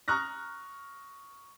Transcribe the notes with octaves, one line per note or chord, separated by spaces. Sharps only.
A#5 C#6 D#6 F6 F#6 A#6